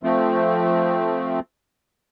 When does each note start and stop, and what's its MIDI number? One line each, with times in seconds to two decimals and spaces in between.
0.03 1.40 53
0.03 1.40 57
0.03 1.40 60